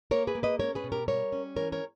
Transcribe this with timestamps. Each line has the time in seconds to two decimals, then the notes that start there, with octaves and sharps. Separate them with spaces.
0.11 A#3 A#4 C#5
0.27 G#4 B4
0.35 A#3
0.43 B4 D#5
0.59 C#4 A#4 C#5
0.75 G#4 B4
0.84 B2
0.92 G4 A#4
1.08 G3 A#4 C#5
1.32 C#4
1.56 E3 A#4 C#5
1.72 A#4 C#5